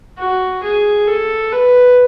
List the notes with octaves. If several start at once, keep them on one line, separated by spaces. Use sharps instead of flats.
F#4
G#4
A4
B4